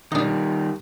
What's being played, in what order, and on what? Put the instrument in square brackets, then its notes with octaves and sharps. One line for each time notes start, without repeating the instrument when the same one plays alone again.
[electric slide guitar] D#3 G3 [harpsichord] D4 D#5